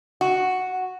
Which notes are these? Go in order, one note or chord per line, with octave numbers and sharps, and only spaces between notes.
F#4